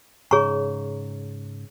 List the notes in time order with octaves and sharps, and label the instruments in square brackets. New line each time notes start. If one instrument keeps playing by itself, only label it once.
[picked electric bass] G#2 C#3 [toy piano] G#4 C#5 A#5 C#6